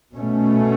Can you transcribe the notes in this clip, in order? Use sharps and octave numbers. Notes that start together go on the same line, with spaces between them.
B2 A3 C#4